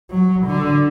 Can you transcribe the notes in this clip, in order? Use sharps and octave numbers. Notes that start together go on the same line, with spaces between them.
F#3
D3